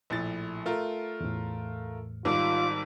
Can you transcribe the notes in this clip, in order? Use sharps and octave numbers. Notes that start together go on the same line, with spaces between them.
A#1 A2 A6
A3 F4 A#4
E2 A2
G#1 D#3 G3 F4 D6